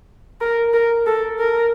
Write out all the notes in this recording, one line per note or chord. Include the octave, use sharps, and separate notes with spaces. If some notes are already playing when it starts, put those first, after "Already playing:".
A#4
A#4
A4
A#4